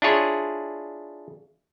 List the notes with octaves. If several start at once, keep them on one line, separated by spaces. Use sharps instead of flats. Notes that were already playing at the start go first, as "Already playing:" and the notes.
D4 E4 F4 G#4 C#5